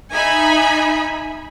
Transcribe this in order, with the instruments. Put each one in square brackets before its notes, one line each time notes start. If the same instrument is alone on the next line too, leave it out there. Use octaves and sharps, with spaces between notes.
[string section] D#4 E5 G#5 B5